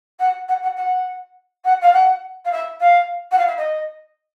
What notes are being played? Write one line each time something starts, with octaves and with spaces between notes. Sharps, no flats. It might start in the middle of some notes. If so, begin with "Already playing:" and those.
F#5
F#5
F#5
F#5
F#5
F5
F#5
F5
E5
F5
F#5
F5
E5
D#5